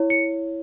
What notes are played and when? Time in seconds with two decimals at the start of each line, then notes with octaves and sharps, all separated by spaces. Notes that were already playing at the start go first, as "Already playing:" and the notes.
Already playing: E4 C#5
0.10 C#7